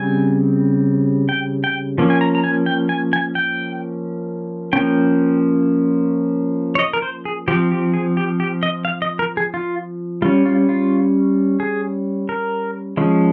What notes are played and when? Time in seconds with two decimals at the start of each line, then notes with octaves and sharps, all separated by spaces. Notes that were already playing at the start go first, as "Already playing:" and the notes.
Already playing: C#3 G3 C4 G#5
1.29 G5
1.64 G5
1.98 F3 A#3 C#4
2.10 G#5
2.21 A#5
2.35 A#5
2.44 G#5
2.66 G5
2.89 G#5
3.13 G#5
3.35 G5
4.73 F3 A#3 C#4 G5
6.75 C#5
6.79 D#5
6.93 A#4
7.02 C5
7.25 G#4
7.48 F3 C4 G4
7.71 G4
7.94 G#4
8.17 G4
8.40 G4
8.63 D#5
8.85 F5
9.02 D#5
9.19 A#4
9.37 G#4
9.54 F4
10.22 G3 C#4 F4
10.46 F4
10.69 F4
11.60 G#4
12.29 A#4
12.97 F3 G#3 C#4